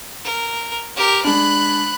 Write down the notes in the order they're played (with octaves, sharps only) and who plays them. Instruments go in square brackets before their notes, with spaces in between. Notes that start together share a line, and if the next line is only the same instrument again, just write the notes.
[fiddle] A#4
G4 A#4
[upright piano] G#3 D4 [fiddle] B5 F#6